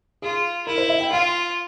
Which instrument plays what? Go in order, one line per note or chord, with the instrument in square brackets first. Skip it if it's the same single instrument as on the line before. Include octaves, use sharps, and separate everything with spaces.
[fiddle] F4 [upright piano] G#4
[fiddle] E4 [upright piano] A#4
[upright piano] C5
E5
G5
[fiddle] F4 [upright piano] F5